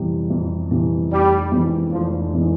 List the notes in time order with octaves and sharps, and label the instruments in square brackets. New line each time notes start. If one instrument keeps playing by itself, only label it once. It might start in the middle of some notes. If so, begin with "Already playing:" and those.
Already playing: [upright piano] F2 C3 E3 G3
F2
C3 E3 G3
[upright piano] F1 [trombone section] G3
[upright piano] F2 E3 G#3
[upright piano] F1 [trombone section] F3
[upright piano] E3 G#3